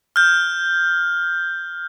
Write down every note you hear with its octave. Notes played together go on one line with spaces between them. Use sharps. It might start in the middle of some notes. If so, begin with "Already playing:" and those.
F6 G6